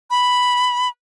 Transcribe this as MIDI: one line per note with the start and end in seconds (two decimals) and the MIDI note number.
0.11 0.89 83